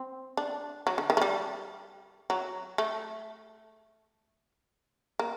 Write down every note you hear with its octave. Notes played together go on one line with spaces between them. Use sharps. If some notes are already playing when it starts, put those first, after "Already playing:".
Already playing: C4
D4
F#3
D3
D#3
A3
G3
F#3
A3
A#3